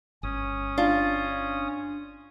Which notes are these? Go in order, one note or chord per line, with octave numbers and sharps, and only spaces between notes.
G1 C#4 D#6
D4 F4